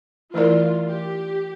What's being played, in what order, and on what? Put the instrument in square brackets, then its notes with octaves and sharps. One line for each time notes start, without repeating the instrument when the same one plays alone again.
[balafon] E3 A3 E4 A#4 D5 [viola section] F4
[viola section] G4